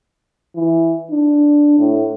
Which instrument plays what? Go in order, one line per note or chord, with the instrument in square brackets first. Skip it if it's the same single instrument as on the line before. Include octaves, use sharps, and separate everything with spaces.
[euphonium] E3
D4
A2